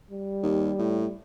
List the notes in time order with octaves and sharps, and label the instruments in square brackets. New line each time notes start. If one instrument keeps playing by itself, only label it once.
[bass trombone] G3
[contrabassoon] D#2
A2